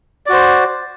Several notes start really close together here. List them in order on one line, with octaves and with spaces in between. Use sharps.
D5 F#4 C5